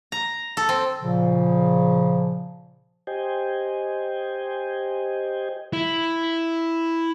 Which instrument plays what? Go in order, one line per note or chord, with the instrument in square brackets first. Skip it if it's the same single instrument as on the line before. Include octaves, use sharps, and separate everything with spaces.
[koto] A#5
A4
C4
[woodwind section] A#2 C#3 F3
[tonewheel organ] G4 C5 D#5 G5 G#5
[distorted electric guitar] E4